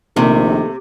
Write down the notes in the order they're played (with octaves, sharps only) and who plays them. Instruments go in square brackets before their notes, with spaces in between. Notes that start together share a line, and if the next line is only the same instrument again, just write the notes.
[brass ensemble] A#1 [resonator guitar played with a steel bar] C3 [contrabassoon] D#3 [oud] A3 A#3